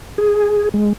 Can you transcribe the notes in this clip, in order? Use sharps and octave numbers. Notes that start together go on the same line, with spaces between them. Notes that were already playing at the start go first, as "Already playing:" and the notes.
G#4
G#3